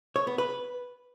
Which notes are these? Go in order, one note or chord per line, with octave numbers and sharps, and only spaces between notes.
C#5
B3
B4